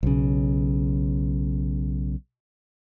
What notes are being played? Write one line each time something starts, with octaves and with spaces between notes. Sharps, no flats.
B1 C#3